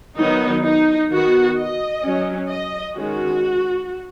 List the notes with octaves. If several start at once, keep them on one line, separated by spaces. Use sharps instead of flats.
D#3 F#3 B3 D#4
D#4
D#3 B3 F#4
D#5
F#3 C#4
D#5
D#3 G#3 C#4 F#4